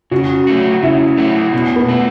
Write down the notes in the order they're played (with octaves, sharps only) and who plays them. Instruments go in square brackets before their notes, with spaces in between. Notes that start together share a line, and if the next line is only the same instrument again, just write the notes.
[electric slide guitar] C#3 [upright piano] F#4
[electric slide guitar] F#3 A3 F#4
[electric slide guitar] C#3 [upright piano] E4
[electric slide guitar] F#3 A3 F#4
B2
[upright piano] B3
[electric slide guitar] A3 F#4